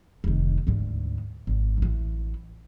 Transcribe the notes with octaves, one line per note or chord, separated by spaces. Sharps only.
F1 D#3
D2 G#2
G#1
A1 E3